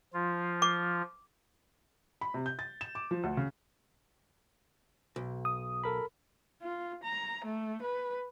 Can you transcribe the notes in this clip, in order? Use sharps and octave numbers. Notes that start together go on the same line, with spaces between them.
F3 F4
D6
B5
C3
G6
A6
E7
D6
F3
D2
C#3
B1
D#6
A4 A#4 B5
F4
A#5
A3
B4